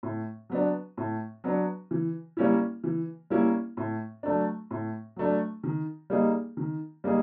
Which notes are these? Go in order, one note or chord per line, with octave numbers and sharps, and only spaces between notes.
A2
F#3 B3 D4
A2
F#3 B3 D4
E3
G3 A#3 C#4 E4
E3
G3 A#3 C#4 E4
A2
F#3 A3 D4
A2
F#3 A3 D4
D#3
G3 A#3 D#4 G#4
D#3
G3 A#3 D#4 G#4